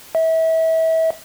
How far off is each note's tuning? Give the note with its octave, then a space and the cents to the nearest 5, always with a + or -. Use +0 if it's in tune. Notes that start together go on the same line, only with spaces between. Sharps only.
E5 -30